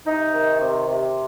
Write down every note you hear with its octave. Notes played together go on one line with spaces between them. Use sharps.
C3 D#4
D#3
C3
C3